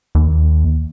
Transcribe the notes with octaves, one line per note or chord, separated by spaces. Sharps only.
D#2